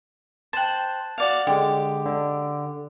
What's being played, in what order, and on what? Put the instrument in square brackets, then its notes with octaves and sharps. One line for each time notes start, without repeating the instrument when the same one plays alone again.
[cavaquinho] C5 G5 [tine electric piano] A5 F#6
[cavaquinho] F#4 D5 F5
[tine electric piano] D3 G#3 [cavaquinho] G4
[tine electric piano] D3